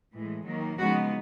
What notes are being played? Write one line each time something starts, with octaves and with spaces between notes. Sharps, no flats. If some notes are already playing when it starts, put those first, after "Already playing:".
A2 E3 G#3
D#3 F#3 A#3
C#3 F3 G#3 B3 D#4 F#4